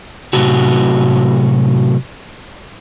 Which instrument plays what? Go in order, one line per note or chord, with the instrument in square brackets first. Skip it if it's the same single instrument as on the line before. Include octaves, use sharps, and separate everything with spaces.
[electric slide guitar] A2 C3 F#3 F#4